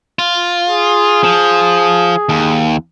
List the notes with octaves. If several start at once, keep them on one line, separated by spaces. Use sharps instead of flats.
F4
G#4
F3
D#2